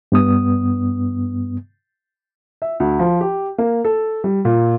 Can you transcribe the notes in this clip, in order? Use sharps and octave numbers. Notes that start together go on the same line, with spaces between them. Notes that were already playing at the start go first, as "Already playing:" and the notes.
G2 B3 D#6
E5
D2
F3
G4
A#3
A4
G3
A#2